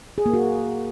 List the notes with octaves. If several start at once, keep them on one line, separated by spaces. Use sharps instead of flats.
G#4
A#3
F#4